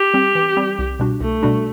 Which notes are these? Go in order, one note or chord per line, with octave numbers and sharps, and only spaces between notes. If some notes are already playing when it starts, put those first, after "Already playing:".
Already playing: G4
G3 C4
E3
G3 C4
C2
B2 G3 D4 F#4
C2 A3
B2 G3 D4 F#4